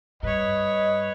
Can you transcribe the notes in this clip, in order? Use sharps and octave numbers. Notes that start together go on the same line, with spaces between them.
G2 B4 C#5 D#5